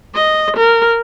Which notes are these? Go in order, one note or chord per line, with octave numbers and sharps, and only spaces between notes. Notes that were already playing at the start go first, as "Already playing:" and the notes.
D#5
A#4